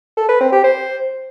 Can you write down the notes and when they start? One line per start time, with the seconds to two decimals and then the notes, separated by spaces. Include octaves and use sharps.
0.17 A4
0.29 B4
0.41 C4
0.52 G4
0.64 C5